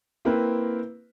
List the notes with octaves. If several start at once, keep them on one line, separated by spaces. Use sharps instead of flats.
A#3 C4 E4 A#4 B4